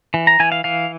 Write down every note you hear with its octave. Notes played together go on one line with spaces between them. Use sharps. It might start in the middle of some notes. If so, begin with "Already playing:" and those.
E3
A#5
E3 G#5
F5
E3 F5